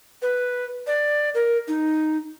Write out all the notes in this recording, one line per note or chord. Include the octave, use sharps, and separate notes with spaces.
B4
D5
A#4
D#4